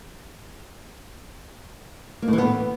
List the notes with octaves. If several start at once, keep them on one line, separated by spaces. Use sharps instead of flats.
A#3
A2
E3
B3